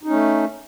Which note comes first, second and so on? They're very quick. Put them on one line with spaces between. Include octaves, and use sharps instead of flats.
D#4 C#4 A3